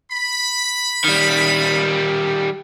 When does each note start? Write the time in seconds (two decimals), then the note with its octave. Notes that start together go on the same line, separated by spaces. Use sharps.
0.11 B5
1.04 D#3 G3